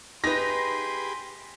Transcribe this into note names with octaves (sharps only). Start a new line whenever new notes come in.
D#4 G4 G#4 B4 B5 C6 A#6